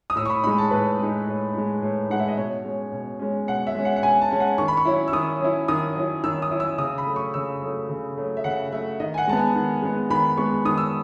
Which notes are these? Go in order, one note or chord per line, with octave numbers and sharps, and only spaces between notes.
D#6
A2 E6
C#6
B5
G#3 D#4 B5
A5
A2 B4
G#3 D#4
A2
G#3 D#4
A2
G#3 D#4 F#5
E5
D#5
B2 C#5
G#3 C#4
B2
G#3 C#4
B2 F#5
E5
G#3 C#4
F#5
F#5
B2 G#5
A5
G#3 C#4
F#5
D#3 C#6
B5
C#6
F#3 C#4 E4
E6
D#3 D#6
F#3 C#4 E4
D#3 D#6
F#3 C#4 E4
D#3 E6
D#6
F#3 C#4 E4
E6
C#3 D#6
B5
F#3 A3
C#6
C#3 E6
F#3 A3
C#3
F#3 A3
E5
C#3 F#5
F#3 A3 E5
D#3 D#5
G#5
F#5
G#3 B3 G#5 A5
D#3
G#3 B3
D#3 B5
G#3 B3 C#6
D#3 D#6
E6